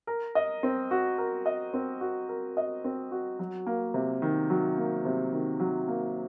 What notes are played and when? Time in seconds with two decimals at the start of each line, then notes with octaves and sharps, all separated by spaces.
0.07 A#4
0.35 D#5
0.63 C4
0.91 F#4
1.18 A#4
1.46 D#5
1.74 C4
2.01 F#4
2.29 A#4
2.57 D#5
2.84 C4
3.12 F#4
3.39 F#3
3.66 A#3
3.94 C3
4.22 D#3
4.50 F#3
4.78 A#3
5.05 C3
5.32 D#3
5.60 F#3
5.88 A#3